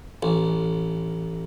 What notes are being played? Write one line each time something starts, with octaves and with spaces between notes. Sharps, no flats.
A1